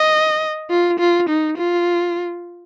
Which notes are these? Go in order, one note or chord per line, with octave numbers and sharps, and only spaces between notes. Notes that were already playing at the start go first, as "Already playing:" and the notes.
Already playing: D#5
F4
F4
D#4
F4